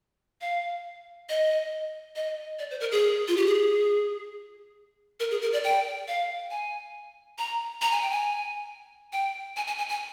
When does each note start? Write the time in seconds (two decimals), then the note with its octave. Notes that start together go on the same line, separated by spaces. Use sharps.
0.41 F5
1.29 D#5
2.16 D#5
2.59 D5
2.71 C5
2.80 A#4
2.92 G#4
3.28 F4
3.37 G4
3.46 G#4
5.20 A#4
5.31 G#4
5.42 A#4
5.53 D5
5.64 G5
6.08 F5
6.51 G#5
7.38 A#5
7.81 A#5
7.92 G#5
8.02 G5
8.11 G#5
9.13 G5
9.56 G#5
9.67 G#5
9.78 G#5
9.89 G#5